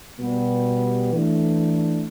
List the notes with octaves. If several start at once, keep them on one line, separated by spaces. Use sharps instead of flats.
B2 G3 B3
E3 A3 D4